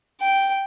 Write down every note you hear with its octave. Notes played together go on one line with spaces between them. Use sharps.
G5